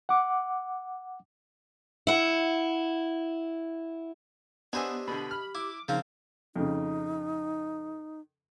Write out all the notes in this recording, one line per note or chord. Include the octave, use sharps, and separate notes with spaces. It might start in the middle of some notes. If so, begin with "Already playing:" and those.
F#5 D6
E4 F#5
B3 D4 G4 C5 C#5 D#5 E5 G#5
B2 D3 B5
F6
E4 D6
C#3 F3 A#3 C4 D#4
F2 C#3 D#4